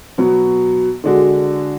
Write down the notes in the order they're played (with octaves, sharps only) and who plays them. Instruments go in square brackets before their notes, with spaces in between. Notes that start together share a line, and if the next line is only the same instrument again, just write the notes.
[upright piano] B2 F#3 B3
D3 G#3 D4 F#4